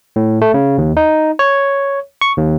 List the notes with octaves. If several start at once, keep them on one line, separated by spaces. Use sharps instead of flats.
A2
A3
C#3
D#2
D#4
C#5
C#6
D#2